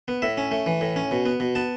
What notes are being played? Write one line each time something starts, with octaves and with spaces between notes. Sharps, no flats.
B3
A2 E5
C#4
A3
E3
A2
C#4
B2
B3
B2
B3 A5